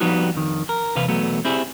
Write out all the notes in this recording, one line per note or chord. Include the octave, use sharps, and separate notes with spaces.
F3 G3 B3 D#4 F#4
F2 D#3
A#4
E2 C3 B4 F5
B1 E2 F#3 A3 B3
C4 E4 G4 G#4